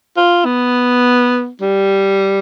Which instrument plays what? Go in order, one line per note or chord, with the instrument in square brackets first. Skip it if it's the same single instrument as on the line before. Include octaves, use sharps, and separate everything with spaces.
[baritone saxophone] F4
B3
G3